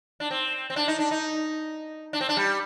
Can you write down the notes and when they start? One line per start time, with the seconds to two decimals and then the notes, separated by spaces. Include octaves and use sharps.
0.20 D4
0.31 C4
0.70 C4
0.76 D4
0.88 D#4
0.99 D4
1.11 D#4
2.13 D4
2.21 C4
2.29 D4
2.37 G3